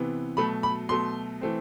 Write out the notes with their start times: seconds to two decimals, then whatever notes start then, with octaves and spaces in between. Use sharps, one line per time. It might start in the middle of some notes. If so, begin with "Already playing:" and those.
Already playing: C3 E3 B3
0.37 B2 F#3 A3 B5
0.63 B5
0.89 B2 F#3 A3 C6
1.41 E3 A3 C4